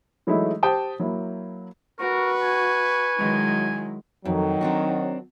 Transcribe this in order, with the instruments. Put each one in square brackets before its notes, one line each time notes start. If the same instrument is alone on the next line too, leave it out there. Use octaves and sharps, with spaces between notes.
[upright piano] E3 F#3 G#3 A3 D#4 E4
G4 C5 G5 A5 D#6
F#3 A#3 E4
[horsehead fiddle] F#4 [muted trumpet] A#4 [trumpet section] B4 C#6
[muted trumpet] G#5
[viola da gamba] D#3 G#3 [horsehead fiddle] F#3 E4
[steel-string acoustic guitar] F2 [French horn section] D#3 F#3
[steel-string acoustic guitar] C4 D4 F#4